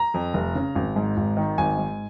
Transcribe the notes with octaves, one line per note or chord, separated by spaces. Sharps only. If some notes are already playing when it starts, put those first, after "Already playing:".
Already playing: A#5
F2
F1
C#3
G#1
G#2
G#1
D#3
G#1 G#5
G#2